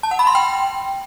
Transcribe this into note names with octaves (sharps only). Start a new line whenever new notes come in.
A5
F#5
B5
C6
G5